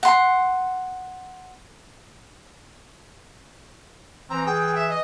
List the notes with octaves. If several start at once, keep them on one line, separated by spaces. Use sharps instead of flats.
F#5 C6
E3 C4 A#5
G#4 G5
E5
D#5